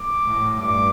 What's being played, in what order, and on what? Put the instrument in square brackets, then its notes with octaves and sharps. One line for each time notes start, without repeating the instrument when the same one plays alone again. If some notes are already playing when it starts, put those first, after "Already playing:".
Already playing: [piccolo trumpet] D6
[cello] A2
[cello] G2 [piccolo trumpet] D6